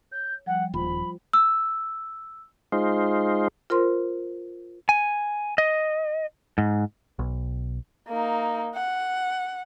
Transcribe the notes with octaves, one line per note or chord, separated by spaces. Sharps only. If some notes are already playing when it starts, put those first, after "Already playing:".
C#5 G6
F3 G3 F#5 G5
D#1 F4 C5 B5
E6
G#3 D#4 F4 C5
F4 A#4 C5 C6
G#5
D#5
G#2
B1
A#3 D#4
F#5